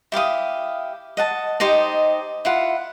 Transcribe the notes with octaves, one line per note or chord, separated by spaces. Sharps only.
E4 G4 F5 D#6
D#5 F#5 A5
D#4 G4 C5 D#5
E4 F4 F#5